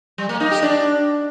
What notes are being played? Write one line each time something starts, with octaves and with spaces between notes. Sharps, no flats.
G3
A#3
D#4
G4
D4